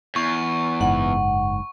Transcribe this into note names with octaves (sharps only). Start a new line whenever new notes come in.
E2 C#6
F#1 G#2 F#5